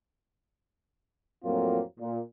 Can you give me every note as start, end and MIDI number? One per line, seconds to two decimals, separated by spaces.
1.44 1.80 41
1.44 1.80 45
1.44 1.80 54
1.44 1.80 58
1.44 1.80 60
1.44 1.80 65
1.99 2.19 46